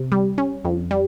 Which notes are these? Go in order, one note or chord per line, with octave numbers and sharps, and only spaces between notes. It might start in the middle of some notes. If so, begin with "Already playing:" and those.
Already playing: C3
G3
C#4
F2
G3